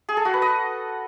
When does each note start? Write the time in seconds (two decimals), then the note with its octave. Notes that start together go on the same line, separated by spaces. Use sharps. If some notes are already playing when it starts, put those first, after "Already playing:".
0.09 G#4
0.17 A4
0.25 F#4
0.34 B4
0.42 D#5